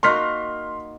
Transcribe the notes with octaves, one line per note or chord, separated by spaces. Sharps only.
A#3 D#4 F#4 C6 F6 B6